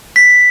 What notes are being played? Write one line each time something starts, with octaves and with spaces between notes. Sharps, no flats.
B6